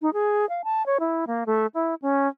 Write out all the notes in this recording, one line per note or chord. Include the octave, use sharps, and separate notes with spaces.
D#4
G#4
F5
A5
C#5
E4
A#3
A3
E4
C#4